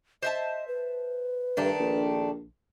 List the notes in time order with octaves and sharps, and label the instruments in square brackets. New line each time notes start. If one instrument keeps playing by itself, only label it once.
[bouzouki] C5 E5 A5 [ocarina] D#5
[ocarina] B4
[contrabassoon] G2 [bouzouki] D#3 A3 D4
[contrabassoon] A#1